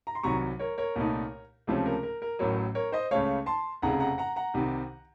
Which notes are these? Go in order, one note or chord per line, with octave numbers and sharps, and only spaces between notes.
A#5
C6
C2 C3 D#3 F#3 A#5 C#6
A#4 C#5
A#4 C#5
C2 A#2 A3 D#4
C#2 C3 F3 A3 C#4
A#4
A#4
A#4
A1 A2 F#3 A#4 C#5
A#4 C#5
C5 D#5
C#2 C#3 A3 C#5 F5
A5 C6
F1 F2 C#3 F#5 A#5
F#5 A#5
F#5 A#5
F#5 A#5
C2 C3 D#3